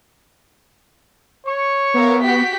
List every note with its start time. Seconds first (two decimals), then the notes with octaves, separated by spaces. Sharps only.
1.47 C#5 C#6
1.94 B3 A#4 E5 F5
2.24 F#4 G4 B6